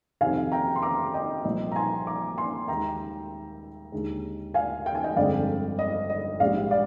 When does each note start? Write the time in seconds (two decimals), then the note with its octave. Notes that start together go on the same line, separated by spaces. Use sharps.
0.21 F2 C3 D#3 F5 G#5
0.52 G5 A#5
0.76 C6
0.82 A#5 D6
1.14 D#5 G5
1.45 C2 A#2 F3 D#5
1.72 A#5
1.76 G#5 C6
2.07 A#5 D6
2.37 G#5 C6
2.68 D#2 D#3 G#3 G5 A#5
3.92 D#2 D3 G#3
4.54 F5 G#5
4.86 G5
4.95 G#5
5.04 D#5 G5
5.16 G1 F2 D3 G#3 D5 F5
5.79 D#5
6.10 D#5
6.40 A#1 G#2 G3 D5 F5
6.71 D5 F5